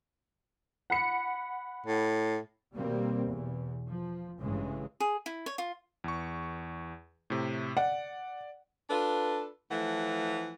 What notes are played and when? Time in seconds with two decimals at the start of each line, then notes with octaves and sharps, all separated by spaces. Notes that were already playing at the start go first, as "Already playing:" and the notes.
0.90 F#5 B5 C#7
1.86 A2
2.74 B2 D#3 G3 A#3 C4
3.25 E2 B2
3.87 F3
4.38 A1 G2 C#3 E3 G#3
5.00 G#4
5.26 E4
5.46 C#5
5.58 F4
6.04 E2 C#6
7.30 A2 C3
7.77 D5 F#5
8.90 D4 F4 A4 B4
9.71 E3 F3 A3 F#5